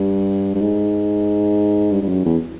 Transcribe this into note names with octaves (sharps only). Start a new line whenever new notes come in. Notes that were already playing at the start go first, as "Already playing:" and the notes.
Already playing: G2
G2
G#2
G2
G2
F#2
E2